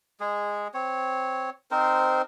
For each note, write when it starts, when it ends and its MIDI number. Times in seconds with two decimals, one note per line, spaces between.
0.20 0.68 56
0.20 0.68 68
0.74 1.50 60
0.74 1.50 73
1.71 2.22 60
1.71 2.22 63
1.71 2.22 70
1.71 2.22 72